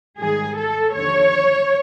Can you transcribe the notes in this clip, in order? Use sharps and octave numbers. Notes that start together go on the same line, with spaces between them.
G#2 D#3 G3 G#4
A4
D#2 D3 F3 C#5